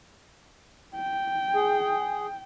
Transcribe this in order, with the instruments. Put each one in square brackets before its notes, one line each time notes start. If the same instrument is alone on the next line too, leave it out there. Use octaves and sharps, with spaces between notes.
[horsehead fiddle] G5
[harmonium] G#4